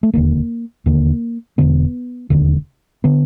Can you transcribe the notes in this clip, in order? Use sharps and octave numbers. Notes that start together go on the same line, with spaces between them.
A3
E1 D#2 D3 A#3
E1 D#2 D3 A#3
E1 D#2 D3 B3
E1 D#2 D3
D3 B3